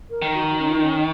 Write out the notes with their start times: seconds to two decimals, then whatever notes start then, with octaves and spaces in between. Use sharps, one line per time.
0.10 A#4
0.22 D#3
0.34 F#4
0.58 C#4
0.68 F4
0.75 D#4
0.82 C#4